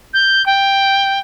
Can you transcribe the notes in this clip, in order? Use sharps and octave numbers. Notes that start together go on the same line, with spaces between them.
G6
G5